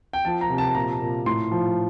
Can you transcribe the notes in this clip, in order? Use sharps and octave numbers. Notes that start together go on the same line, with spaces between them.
G5
F3 A5
A#5
C3
A5
A#2 A#5
A#2
A2 C6
F3